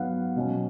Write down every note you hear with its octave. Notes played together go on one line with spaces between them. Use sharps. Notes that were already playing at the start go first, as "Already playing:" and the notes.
Already playing: G#2 F#3 B3 F5 F#5
B2 F#3 C#4